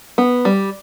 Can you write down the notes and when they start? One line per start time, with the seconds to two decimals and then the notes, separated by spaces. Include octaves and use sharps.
0.18 B3
0.45 G3